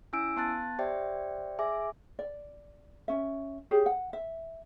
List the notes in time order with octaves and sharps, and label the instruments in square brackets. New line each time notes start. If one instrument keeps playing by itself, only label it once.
[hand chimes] C#4 E4 G#5 E6 D7
B3 A5 F#6 A6
G4 C5 D5 E5 G5
G#4 E5 G#5 D6
[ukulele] D5
C#4 E5
G4 G#4 C#5
F#5
E5